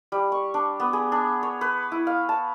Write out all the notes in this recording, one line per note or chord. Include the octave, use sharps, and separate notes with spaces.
G3
C#6
D4
B3
G#4
D4
C#5
B4
E4
F5
A5